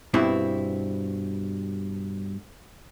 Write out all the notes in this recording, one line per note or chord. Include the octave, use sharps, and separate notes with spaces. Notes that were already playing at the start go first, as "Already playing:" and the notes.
G2 B2 C4 E4